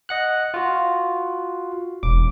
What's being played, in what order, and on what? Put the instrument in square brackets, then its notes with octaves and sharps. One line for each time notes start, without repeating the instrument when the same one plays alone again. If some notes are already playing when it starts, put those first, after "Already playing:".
[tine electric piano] D#5 F#5 F#6
F4 F#4
[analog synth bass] E1 [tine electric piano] D6